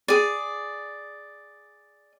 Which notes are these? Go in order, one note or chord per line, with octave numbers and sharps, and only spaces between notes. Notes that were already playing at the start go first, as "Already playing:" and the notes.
G#4 D5